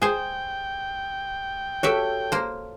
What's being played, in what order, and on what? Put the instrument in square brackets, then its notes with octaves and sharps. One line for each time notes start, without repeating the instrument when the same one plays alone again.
[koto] G#4 C5 [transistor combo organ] G5
[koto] F#4 G4 E5 [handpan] A4 C#5
[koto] A#3 C5